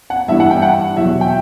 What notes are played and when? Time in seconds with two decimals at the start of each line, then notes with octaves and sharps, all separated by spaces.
0.10 F#5
0.28 G2 E3 G3 E5
0.40 F#5
0.51 G5
0.62 F#5
0.97 E2 B2 F#3 E5
1.21 G5